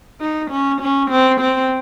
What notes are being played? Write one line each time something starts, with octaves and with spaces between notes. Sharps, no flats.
D#4
C#4
C#4
C4
C4